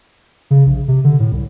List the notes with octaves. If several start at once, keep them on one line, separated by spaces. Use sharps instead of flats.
C#3
A#1
C3
D3
A2
C2